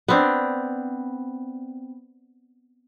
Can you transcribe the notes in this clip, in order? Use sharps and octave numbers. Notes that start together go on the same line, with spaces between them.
B3 C4 D4